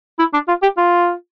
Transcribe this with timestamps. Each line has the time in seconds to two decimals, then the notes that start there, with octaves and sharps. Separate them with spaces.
0.19 E4
0.33 D4
0.48 F4
0.62 G4
0.77 F4